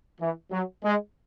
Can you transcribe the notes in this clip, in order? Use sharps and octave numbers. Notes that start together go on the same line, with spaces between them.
E3
F#3
G#3